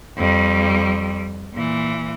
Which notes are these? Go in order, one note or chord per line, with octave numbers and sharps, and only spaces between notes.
F2 G3
A#2 E3